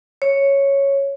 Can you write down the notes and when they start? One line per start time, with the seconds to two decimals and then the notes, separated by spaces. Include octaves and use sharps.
0.22 C#5